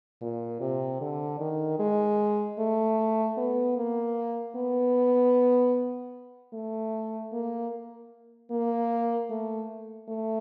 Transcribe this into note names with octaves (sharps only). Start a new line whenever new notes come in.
A#2
C3
D3
D#3
G#3
A3
B3
A#3
B3
A3
A#3
A#3
A3
A3